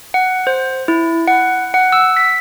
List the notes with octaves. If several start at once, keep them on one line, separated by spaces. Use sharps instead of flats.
F#5
C5
E4
F#5
F#5
E6
B6